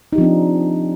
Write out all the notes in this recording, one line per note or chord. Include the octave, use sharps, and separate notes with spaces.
F3 C4 D4 D#4 G4